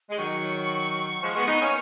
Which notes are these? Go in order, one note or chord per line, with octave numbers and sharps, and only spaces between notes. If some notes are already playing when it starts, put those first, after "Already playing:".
G#3
D#3 F#3 C#6
F3 G#3
G#3 B3
B3 D#4
A#3 C#4